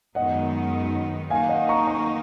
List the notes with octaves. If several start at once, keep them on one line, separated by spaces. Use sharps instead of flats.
F#2 D#3 G#3 B3 D#4 D#5 F#5
D#3 A#3 D#4 F5 G#5
D#5 F#5
A#5 C#6
A#5 C#6